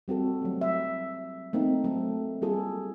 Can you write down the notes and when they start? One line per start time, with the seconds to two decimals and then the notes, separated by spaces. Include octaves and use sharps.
0.08 G3 C4 F#4 A4
0.42 F#3 A3
0.61 E5
1.53 A3 A#3 C4 D#4
1.84 F#3 A3 A4
2.42 G3 A#3 F4 G#4 A4